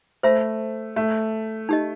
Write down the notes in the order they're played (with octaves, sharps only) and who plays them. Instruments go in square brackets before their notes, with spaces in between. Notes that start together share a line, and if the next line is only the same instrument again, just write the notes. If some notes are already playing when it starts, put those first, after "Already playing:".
[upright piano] A3 [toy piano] C5 E5 B5
[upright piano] A3
[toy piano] D#4 G4 D#5